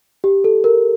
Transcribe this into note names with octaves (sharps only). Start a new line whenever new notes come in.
G4
A4
A#4